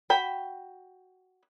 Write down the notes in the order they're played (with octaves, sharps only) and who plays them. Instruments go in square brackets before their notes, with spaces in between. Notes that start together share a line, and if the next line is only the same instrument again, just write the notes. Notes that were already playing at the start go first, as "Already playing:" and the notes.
[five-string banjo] F#4 G5 B5